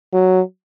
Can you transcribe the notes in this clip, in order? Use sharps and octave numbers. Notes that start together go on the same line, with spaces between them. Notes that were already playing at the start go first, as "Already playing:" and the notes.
F#3